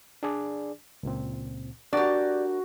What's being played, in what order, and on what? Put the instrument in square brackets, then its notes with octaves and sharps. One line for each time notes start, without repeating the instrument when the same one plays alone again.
[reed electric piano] D4 G#4 D5
C#2 A#2 C4
[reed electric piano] D4 A#4 [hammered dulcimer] F#4 [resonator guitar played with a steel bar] G4 D5